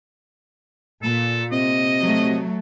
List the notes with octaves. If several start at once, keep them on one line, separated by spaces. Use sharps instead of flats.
A#2 A4
C3 D#5
F#3 A3